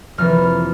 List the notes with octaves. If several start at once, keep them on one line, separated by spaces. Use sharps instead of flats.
F1 F2 E3 A#3 F6